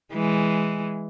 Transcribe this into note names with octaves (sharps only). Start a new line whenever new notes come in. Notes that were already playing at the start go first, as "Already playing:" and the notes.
E3 G#3